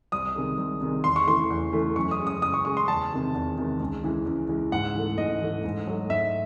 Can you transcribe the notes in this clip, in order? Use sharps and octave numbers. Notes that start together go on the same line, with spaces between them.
C2 D#6
C3 D#3 G#3
C2
C3 D#3 G#3
E2 C6
C#6
C#3 E3 A3 C6
E2
C#3 E3 A3
F#2 C#6
D#6
C#3 G#3
D#6
F#2 D#6
C#6
C#3 G#3 C#6
C6
E2 A5
C3 D#3 G#3
E2
C3 D#3 G#3
C#2
C#3 E3 G#3
C#2
C#3 E3 G#3
G#2 F#5
E3 A3
G#2 D#5
E3 A3
G#2
F#3 A3
G#2 E5